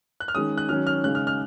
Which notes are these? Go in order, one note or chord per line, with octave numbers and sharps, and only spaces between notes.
F#6
F6
D#3 G#3 C#4 D#6
F#6
D#3 F#3 C#4 F6
F6
C#3 G#3 D#4 F#6
F6
F6